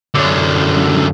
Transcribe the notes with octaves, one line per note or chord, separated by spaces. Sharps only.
F#2 D3